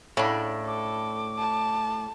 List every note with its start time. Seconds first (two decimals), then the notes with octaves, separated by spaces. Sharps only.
0.17 A2 C#3 D4
0.67 A4 D6
1.39 A5